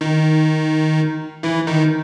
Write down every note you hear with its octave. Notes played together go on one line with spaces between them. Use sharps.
D#3 D#4
E3 E4
D#3 D#4